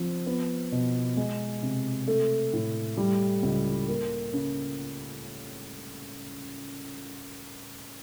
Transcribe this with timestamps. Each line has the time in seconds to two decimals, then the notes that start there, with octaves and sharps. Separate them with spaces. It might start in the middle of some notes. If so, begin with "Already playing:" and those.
Already playing: F3 C4
0.27 B3
0.72 B2
1.17 G#3
1.63 C3
2.08 A3
2.53 A2
2.97 G3
3.43 C#2
3.88 A#3
4.33 C#3